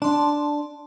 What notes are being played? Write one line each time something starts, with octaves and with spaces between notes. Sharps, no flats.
D4 A5 C6